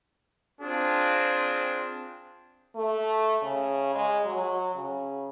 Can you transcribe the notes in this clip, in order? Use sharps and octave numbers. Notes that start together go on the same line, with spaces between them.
C4 D4 F4 G#4
A3
C#3
G#3
F#3
C#3